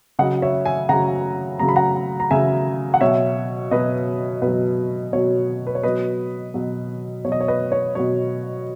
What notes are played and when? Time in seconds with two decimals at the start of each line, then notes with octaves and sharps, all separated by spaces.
0.19 C#3 F#3 D#5 F#5
0.42 C#5 E5
0.65 E5 G#5
0.89 C#3 F#3 F#5 A#5
1.59 C#3 F#3 A#5
1.69 B5
1.76 F#5 A#5
2.20 A#5
2.31 C#3 F#3 E5 G#5
2.94 F#5
3.01 B2 F#3 C#5 E5
3.71 B2 F#3 B4 D#5
4.42 B2 B4
4.47 F#3
5.13 B2 F#3 C#5
5.67 B4
5.75 C#5
5.83 B2 F#3 B4 D#5
6.54 B2 F#3
7.25 B2 C#5
7.28 F#3 D#5
7.41 C#5
7.48 B4 D#5
7.72 C#5
7.95 B2 F#3 C#5